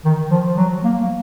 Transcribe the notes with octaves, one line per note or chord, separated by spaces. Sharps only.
D#3
F3
F#3
A#3